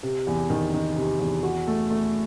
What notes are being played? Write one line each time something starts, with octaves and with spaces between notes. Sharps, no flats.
C3
E2
D#3
D#3
C3
E2
F#4
A3
A3